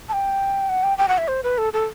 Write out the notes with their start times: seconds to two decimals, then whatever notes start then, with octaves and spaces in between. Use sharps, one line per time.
0.09 A5
0.13 G5
0.69 F#5
0.83 G5
0.98 G5
1.08 F#5
1.18 E5
1.28 C5
1.43 B4
1.58 A4
1.73 A4